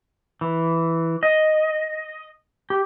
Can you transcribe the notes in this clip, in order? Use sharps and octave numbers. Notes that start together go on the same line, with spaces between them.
E3
D#5
G4